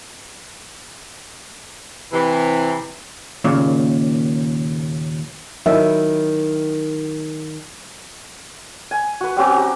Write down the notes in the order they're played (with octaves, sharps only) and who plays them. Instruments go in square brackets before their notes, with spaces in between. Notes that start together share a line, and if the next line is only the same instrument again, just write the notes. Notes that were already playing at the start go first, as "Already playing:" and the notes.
[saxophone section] C3 E3
[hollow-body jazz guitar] D#2 A#2 C#3
[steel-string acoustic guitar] D#3 [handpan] F#3 E4 [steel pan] E5
[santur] G#5
F#4 B4
G3 C4 C#4 F#4
G4 A#5